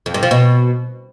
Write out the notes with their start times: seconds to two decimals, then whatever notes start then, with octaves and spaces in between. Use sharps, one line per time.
0.06 F2
0.14 G2
0.23 F3
0.31 B2